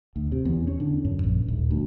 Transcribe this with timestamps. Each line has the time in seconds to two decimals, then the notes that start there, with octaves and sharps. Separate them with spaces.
0.16 D2
0.32 C3
0.45 E2
0.67 C#4
0.80 D3
1.05 F#2
1.24 A#1
1.48 D#1
1.71 D2